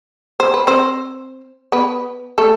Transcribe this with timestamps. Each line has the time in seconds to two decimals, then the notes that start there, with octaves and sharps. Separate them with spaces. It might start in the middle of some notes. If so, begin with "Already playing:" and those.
0.40 C5
0.54 B4
0.67 C4 C5
1.72 B3 B4
2.38 A3 A4